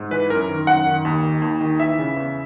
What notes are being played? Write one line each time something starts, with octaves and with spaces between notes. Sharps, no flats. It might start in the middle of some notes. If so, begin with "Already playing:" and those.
Already playing: G#2
E3 B4
F#2 A#4
D#3
F#2 F#5
D#3
D#2
D#3
D#2
D#3
E3 E5
C#3
E2